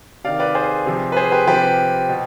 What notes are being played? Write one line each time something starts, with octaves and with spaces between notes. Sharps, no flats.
C3 D#3 D5 F5
B4 D5
G#4 C5
C3 F3
B4
G#4 C5
G4 B4
C3 F3 G4 B4
B2